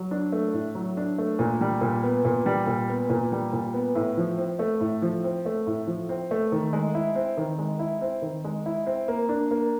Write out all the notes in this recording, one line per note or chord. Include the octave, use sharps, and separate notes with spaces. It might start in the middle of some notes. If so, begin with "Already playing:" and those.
Already playing: F#3
D4
A3
A2
F#3
D4
A3
A#2
G3
A#2
B3
A#2
G3
A#2
B3
A#2
G3
A#2
B3
A2
F3
C4
A3
A2
F3
C4
A3
A2
F3
C4
A3
D#3
G#3
E4
C4
D#3
G#3
E4
C4
D#3
G#3
E4
C4
A#3
D4
A#3